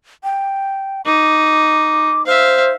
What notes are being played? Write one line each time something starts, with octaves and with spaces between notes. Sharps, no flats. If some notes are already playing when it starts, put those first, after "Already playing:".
G5
D#4 D6
C5 E5 F5